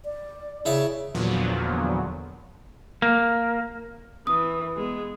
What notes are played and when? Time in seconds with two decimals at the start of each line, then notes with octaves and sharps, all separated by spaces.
0.05 D5
0.66 C#3 E4 E5 A5
1.14 E2 A#2 D3 F3 F#3 B3
3.02 A#3
4.27 E3 D#6
4.76 G#3 B3